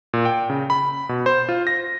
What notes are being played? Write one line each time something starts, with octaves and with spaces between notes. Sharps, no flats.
A#2
G5
C#3
B5
B2
C5
F4
A#6